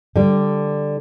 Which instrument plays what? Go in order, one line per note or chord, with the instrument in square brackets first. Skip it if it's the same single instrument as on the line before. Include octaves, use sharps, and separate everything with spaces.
[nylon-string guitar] D3 G3